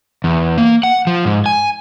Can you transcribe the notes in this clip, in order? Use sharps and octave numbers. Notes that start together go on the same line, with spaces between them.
E2
A#3
F#5
F3
G#2
G#5